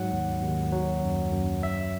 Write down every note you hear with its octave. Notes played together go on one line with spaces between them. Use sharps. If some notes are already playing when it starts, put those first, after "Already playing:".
Already playing: G#2 F#3 F#5
D#2
D#2
F#3
F#2
F#2
F#3 E5